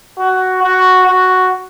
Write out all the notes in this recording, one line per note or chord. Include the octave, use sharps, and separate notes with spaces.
F#4
F#4
F#4